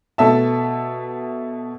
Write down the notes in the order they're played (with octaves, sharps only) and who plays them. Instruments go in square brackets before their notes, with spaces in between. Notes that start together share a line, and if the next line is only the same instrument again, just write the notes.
[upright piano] B2 A3 E5 A5